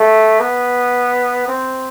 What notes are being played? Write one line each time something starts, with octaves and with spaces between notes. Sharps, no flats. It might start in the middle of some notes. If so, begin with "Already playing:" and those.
Already playing: A3
B3
C4